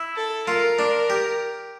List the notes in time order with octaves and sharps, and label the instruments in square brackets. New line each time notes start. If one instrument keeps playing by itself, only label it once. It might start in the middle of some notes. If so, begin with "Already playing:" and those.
Already playing: [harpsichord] E4
[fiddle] A4
[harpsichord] F4 [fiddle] A#4
[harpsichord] D4
G4